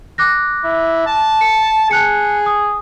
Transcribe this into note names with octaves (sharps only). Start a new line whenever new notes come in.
D6 F#6 A#6
E4
A5
C#7
G#4 A5 F#6 C#7
D#6